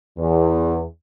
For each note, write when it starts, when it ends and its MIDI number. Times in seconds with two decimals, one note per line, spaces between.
0.18 0.82 40